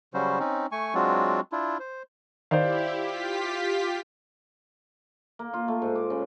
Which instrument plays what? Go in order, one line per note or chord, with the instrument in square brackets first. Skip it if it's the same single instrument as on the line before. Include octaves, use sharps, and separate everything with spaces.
[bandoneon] C#3 F#3 G3 C#4 F#4 C5
C4 C#4 D#4
A3 G#5 C#6
F#3 G#3 C4 D4 F4 F#4
D4 E4 F4
C5
[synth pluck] D#3 [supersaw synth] E4 G4 [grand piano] C5 D5 F5
[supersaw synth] F4 G4 B6
[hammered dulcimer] A#3
F4
A3
G#2
D6
C#3